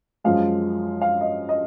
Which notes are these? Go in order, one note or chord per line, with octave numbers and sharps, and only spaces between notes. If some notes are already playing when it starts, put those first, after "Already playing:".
F#2 F3 G#3 F5
F5
D#5
D#5